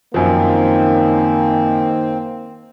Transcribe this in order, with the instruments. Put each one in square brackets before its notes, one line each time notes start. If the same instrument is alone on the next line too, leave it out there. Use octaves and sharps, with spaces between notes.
[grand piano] F#2 F3 [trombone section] D#3 D#4 [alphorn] A#3 [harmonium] C4